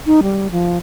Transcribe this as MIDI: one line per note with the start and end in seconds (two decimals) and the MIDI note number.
0.06 0.21 63
0.23 0.48 55
0.51 0.78 53